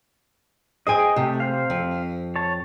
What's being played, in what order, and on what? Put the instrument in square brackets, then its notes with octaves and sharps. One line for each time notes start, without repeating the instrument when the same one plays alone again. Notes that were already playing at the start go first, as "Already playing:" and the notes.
[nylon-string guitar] G#4 C5 G#5 [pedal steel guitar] D#5 G5
[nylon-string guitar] C3 [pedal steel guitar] A3 G4
[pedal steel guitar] C5 F5
[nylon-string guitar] F2
[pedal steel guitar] C#5 A5